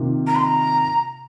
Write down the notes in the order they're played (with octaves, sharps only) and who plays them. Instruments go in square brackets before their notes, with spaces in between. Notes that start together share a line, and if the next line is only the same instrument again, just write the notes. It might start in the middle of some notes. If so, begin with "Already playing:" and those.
Already playing: [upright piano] C3 D#3 A#3 F4
[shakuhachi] A#5
C6
A#5